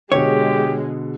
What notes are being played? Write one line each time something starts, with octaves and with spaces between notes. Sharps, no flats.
B2 D3 G#3 G4 C#5